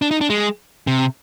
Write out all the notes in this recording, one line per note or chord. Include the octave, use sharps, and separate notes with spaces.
D4
D#4
D4
G#3
C3